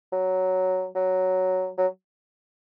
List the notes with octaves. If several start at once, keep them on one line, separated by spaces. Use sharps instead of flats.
F#3
F#3
F#3